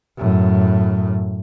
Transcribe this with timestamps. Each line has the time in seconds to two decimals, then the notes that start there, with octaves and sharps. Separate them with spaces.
0.17 F#2 A2